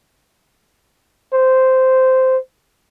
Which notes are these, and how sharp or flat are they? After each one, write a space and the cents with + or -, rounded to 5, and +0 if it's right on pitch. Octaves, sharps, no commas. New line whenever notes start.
C5 -10